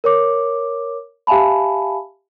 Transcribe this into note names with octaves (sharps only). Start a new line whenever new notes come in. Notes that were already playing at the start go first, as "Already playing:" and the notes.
A#4 C#5 D6
G4 E5 F5 G#5 A5 B5